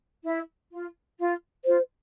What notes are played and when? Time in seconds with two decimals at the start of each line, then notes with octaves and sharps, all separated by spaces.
0.25 E4
0.71 F4
1.19 F4
1.65 F4 C5